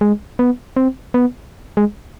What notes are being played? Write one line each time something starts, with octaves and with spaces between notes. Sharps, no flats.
G#3
B3
C4
B3
G#3